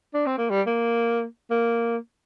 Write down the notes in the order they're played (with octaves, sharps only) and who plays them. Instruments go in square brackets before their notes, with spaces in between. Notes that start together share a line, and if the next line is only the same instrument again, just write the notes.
[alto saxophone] D4
C4
A#3
G3
A#3
A#3